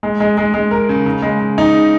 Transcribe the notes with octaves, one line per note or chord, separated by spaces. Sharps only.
G#3
G#3
G#3
G#3
A#4
C#3
C#3
G#3
C#3
D#4
C#3